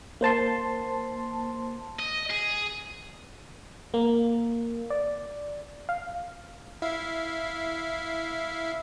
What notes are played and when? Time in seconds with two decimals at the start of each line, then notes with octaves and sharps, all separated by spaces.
0.21 A#3 C5 A5 C6
1.99 D#5
2.30 G#4
3.94 A#3
4.90 D5
5.89 F5
6.82 E4 E5 F5